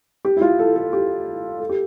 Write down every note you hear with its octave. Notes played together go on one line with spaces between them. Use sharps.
G4
E4
F4
A4
A4
G4
A4
G4